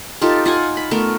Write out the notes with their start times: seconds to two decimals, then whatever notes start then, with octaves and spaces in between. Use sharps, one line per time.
0.22 D#4 F4 G4 A4
0.46 F4 F#5 G#5
0.77 B5
0.91 A3 B3 A#4